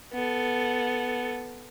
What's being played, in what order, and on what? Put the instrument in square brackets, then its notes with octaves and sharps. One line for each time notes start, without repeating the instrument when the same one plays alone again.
[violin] B3 A4